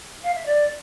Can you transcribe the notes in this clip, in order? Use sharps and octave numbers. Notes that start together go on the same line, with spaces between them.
F5
E5
D5